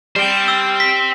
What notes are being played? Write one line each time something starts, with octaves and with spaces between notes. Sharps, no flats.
G3 C5 G5
E6
B6